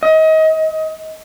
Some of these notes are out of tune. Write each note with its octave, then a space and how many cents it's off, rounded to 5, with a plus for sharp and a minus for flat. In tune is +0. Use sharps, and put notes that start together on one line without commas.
D#5 +30